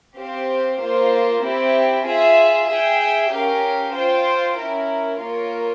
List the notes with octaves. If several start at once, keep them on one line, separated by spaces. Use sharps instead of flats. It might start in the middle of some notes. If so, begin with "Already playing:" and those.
C4 G4 C5 F5
A#3 F4 C5
C4 E4 G4
F4 G#4 E5
G#4 E5 G5
C#4 G4 A#4 F5
F4 C5 G5
C#4 E4 A#4
A#3 F4 A#4 C#5